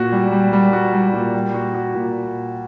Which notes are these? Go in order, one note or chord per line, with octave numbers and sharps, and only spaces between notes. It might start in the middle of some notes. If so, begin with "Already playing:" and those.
Already playing: A#2 F#4
G3
G3
G3
F#4
G3
A#2
G3
F#4
F#4
A#2